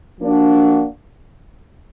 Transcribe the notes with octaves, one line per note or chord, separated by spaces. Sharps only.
F3 A#3 D4 F#4